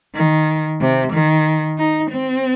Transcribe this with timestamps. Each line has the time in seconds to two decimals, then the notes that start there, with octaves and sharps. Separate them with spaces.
0.15 D#3
0.80 C3
1.13 D#3
1.78 D#4
2.11 C4